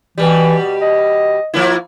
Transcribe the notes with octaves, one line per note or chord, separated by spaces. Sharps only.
B2 E3 G3
D#5
F3 A#3 E4